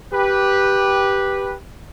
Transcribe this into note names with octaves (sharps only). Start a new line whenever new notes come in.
G4 B4